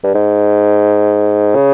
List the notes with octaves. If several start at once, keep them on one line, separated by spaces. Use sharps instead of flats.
G2
G#2
C#3